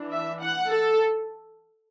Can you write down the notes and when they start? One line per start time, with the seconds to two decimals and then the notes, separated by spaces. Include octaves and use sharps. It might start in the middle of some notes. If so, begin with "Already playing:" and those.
Already playing: E3 D4
0.12 E5
0.42 F#5
0.69 A4